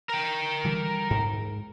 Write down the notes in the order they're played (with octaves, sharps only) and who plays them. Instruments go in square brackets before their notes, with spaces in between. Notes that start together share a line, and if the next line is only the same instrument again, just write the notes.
[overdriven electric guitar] A#4 G5
[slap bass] D3 E3 G3
G#2